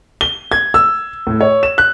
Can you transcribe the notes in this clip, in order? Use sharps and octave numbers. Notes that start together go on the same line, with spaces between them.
G7
G#6
E6
A2
C#5
E7
F#6